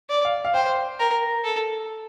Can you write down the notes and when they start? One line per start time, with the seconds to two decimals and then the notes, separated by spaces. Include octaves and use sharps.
0.09 D5
0.25 F5
0.45 F5
0.54 C5 G5
0.99 A#4
1.44 A4